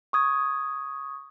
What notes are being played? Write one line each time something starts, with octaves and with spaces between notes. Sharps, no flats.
C#6 D#6 G#6